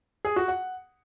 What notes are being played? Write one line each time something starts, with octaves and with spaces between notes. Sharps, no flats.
G#4
F#4
F#5